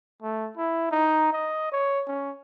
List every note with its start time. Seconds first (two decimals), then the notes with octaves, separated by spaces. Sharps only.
0.23 A3
0.57 E4
0.91 D#4
1.33 D#5
1.72 C#5
2.07 C#4